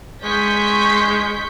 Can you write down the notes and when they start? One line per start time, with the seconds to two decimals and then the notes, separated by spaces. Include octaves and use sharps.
0.24 G#3 C#6 G6 B6